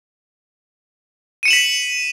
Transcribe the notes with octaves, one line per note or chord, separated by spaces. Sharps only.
B6 C#7 D#7 E7 F#7